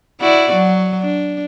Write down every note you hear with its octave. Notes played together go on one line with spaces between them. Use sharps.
E4 F#4 D5
F#3
D4